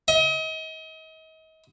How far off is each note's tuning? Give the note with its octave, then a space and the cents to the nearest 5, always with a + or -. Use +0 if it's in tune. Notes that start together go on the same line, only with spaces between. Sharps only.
D#5 +35